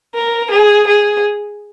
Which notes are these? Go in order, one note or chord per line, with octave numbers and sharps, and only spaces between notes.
A#4
G#4
G#4